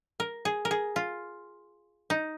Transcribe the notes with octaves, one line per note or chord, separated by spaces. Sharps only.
A#4
G#4
A#4
G#4
F4
D#4